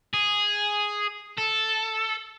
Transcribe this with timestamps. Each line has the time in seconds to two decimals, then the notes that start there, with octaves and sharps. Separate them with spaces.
0.14 G#4
1.38 A4